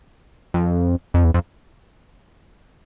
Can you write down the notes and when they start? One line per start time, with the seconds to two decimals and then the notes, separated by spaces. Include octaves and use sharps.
0.54 F2
1.14 F2
1.24 E2
1.34 F2